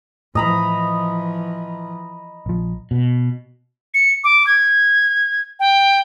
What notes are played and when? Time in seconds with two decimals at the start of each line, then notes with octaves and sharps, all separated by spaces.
0.35 A2 E3 F3 D#5 A#5 B5
2.46 A#1 F3
2.91 B2
3.94 C#7
4.24 D6
4.47 G#6
5.60 G5